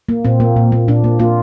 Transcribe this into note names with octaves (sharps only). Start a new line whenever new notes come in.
A#3
A#2 C4
A#3
A#2
A#3
A#2 D4
A#3
A#3 F4